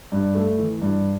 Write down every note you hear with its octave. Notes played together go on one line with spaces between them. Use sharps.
G2
A3
E3
G2